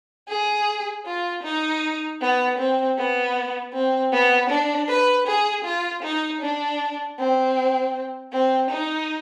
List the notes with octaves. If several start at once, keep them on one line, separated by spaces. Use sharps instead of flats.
G#4
F4
D#4
B3
C4
B3
C4
B3
D4
B4
G#4
F4
D#4
D4
C4
C4
D#4